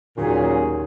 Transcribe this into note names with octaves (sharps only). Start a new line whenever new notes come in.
D#2 A#2 D#3 F#3 C#4 G#4